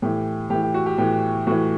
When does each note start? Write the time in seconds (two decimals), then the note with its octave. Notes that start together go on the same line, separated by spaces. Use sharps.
0.02 A2 E3 G4
0.50 A2 G4
0.54 E3
0.62 G4
0.74 F#4
0.86 G4
0.98 A2 E3 G4
1.47 A2 E3 F#4